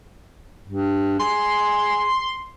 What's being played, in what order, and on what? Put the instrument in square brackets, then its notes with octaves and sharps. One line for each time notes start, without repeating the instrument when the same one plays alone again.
[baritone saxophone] G2
[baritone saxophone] G#4 [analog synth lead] C6